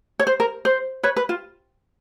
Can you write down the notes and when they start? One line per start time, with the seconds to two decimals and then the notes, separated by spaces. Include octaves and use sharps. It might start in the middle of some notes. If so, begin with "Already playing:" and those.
0.19 C#5
0.27 C5
0.40 A#4
0.65 C5
1.03 B4 C#5
1.16 B4
1.29 F4